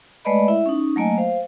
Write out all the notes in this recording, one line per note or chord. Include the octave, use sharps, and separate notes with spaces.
G#3 A3 B4 D5 D#5 B5
E4 E5
C#4 D#4
F#3 A3 A#3 D#5 G#5
C5 F5